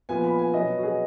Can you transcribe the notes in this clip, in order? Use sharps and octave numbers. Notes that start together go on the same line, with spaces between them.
A#2 F3 B3 G#5
B5
G#5
B2 F#3 B3 D#5
F#4
G#4